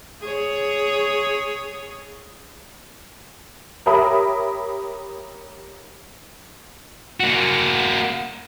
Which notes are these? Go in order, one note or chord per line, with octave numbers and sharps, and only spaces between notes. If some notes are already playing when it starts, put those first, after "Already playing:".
G#4 C#5
G4 A#4 C#5 E5 B5 D#6
A#3 F#4